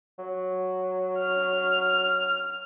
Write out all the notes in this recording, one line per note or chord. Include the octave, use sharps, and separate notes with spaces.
F#3
F6